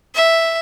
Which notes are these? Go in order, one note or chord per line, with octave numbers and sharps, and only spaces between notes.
E5